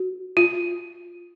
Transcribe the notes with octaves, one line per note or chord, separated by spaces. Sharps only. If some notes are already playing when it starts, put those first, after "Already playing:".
Already playing: F#4
F4